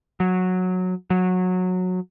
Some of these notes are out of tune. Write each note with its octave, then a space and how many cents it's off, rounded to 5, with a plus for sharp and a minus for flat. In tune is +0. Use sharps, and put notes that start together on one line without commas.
F#3 -10
F#3 -15